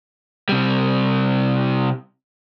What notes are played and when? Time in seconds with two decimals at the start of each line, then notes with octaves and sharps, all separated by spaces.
0.49 C3 G3